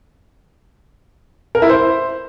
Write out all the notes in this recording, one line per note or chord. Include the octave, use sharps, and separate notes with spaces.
A#4
E4
C5